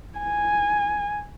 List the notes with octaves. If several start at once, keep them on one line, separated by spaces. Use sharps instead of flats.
G#5